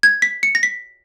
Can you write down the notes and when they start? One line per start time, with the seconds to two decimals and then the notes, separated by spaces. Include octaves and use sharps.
0.03 G#6
0.22 B6
0.43 C#7
0.55 A#6
0.63 B6